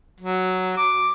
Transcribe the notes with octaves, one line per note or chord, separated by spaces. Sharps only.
F#3
D6